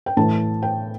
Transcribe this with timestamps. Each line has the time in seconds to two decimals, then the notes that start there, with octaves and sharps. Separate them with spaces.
0.06 G5
0.17 A2 E3 A3 A5
0.63 G5